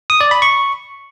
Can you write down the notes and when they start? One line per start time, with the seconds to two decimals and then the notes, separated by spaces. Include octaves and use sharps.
0.10 D#6
0.21 D5
0.31 B5
0.42 C#6